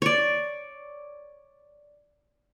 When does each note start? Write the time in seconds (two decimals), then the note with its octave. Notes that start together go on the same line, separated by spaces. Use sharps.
0.02 C#5 D5